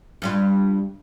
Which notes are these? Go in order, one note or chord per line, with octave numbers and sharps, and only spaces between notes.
G2 G3 F4